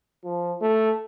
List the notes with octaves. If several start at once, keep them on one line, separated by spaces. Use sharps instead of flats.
F3
A3